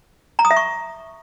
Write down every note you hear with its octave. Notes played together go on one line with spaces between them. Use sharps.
A#5
D#6
E5
C#6